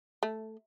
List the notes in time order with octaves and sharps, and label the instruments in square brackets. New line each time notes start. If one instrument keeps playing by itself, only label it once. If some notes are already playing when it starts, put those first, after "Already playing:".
[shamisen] A3